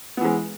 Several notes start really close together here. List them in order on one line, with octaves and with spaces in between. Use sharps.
B3 E3 G#3